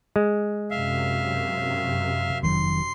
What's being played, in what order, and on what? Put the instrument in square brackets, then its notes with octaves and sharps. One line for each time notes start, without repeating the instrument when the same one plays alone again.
[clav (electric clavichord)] G#3
[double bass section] F#2 C3 [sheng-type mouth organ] E5 F5
[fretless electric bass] F1 D#3 F#3 [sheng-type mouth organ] C6